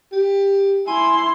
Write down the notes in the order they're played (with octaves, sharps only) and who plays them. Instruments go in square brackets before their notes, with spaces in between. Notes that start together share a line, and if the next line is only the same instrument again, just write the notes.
[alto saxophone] G4
[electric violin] E4 C6 [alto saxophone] G#5